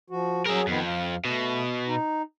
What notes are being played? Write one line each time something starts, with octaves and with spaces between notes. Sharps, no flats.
F3 F#4
F#3 G#4 A#4 E5
F2 D#3 B3
F5
B2 A3
D#4